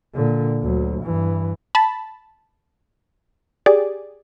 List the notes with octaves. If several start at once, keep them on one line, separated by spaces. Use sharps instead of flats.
A#2 D3
D2 F#3
G2 E3
A5 B5
G4 G#4 D5